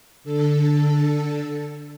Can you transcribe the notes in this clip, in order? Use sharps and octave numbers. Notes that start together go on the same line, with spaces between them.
D3 A4